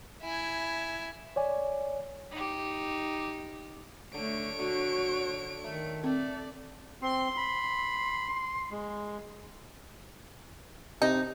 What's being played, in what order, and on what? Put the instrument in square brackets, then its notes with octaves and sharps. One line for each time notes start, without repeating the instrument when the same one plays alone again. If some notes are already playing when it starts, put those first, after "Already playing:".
[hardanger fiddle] E4 G#5
[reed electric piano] C#5 D5 G#5
[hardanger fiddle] D#4 G4
[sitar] D3 [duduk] A3 [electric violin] C#5 D7
[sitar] D3 [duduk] F#4
[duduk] D#3 [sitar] A3
[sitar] A3 [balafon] C4 [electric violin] D5
[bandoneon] C4 [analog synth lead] C6
[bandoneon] B5
G#3
[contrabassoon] C3 [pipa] D#4